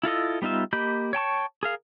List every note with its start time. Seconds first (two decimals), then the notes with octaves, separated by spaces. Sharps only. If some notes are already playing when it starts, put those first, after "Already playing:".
0.03 E4 F4 A4 D#5
0.42 G3 B3 D#4 F4 E5
0.73 A#3 G4 D#5 B5 G6
1.13 C#5 G5 A5 C#6
1.63 G#4 A#4 F5